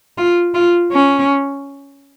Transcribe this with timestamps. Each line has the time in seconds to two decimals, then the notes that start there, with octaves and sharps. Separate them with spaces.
0.18 F4
0.54 F4
0.92 C#4